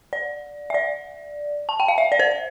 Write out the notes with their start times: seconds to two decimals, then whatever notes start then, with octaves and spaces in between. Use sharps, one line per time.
0.13 D5
0.70 E5
0.74 D5
1.69 A5
1.80 G5
1.88 F5
1.98 E5
2.12 D5
2.19 C5